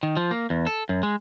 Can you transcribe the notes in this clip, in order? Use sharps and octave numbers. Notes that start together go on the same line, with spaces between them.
D#3
F3
A#3
E2
A4
F#2
G#3